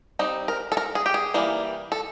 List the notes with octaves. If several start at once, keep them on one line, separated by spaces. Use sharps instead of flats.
G3 C4 D#4
A#4
A4
A#4
G#4
G4
G#4
E3 G3 A#3
A4